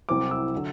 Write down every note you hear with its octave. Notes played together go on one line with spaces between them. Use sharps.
C2 C3 F#3 C4 E4 D6
E6
D3 F#3